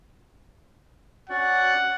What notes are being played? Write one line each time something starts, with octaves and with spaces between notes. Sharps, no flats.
C#4 F#4 D5 F#5